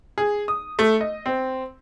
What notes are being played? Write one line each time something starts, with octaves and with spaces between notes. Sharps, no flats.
G#4
D#6
A3
D#5
C4